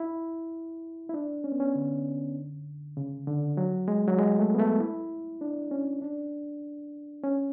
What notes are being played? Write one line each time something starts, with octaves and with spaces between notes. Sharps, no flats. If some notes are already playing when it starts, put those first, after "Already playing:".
Already playing: E4
E4
D4
C#4
B3
C#4
D3
C#3
D3
F#3
G#3
F#3
G#3
A3
B3
A3
E4
D4
C#4
D4
C#4